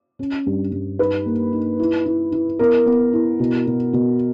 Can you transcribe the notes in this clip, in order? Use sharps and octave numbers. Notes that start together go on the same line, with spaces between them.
C#4
G2
G2
D#4 B4
A#3
D#4
E4
E4
E4
B3 A#4
B3
E4
B2
B2
B2